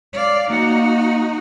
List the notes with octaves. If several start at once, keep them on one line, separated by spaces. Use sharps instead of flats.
D5 F5
A#3 D#4 F#4 F#5